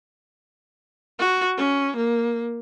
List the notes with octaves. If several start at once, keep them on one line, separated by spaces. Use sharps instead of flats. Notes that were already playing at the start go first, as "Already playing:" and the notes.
F#4
C#4
A#3